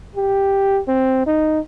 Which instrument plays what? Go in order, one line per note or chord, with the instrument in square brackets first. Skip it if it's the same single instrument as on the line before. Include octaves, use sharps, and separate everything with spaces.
[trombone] G4
C4
D#4